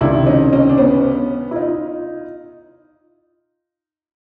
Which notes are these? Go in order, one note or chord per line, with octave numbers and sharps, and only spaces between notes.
C#2 C3 D#3 D4 E4
C#4 D#4
C#4 D#4
D4
B3 C#4
E4
D#4 F4